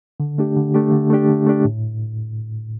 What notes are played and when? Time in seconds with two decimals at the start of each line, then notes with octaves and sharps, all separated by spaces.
0.20 D3
0.38 A3 D4 G4
0.57 D3
0.74 A3 D4 G4
0.92 D3
1.10 A3 D4 G4
1.29 D3
1.46 A3 D4 G4
1.65 A2